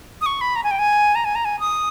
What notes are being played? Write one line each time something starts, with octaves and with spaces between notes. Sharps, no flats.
D#6
C#6
B5
A#5
G#5
G5
G#5
A#5
G#5
A#5
G#5
D#6